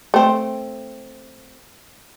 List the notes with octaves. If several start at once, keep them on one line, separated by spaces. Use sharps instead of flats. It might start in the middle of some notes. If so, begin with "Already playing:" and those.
A3 C4